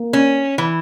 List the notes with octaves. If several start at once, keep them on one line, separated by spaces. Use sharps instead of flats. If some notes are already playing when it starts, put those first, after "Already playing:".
Already playing: A#3
C#4
E3